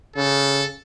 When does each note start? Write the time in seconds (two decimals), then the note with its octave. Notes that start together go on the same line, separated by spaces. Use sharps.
0.16 C#3 A4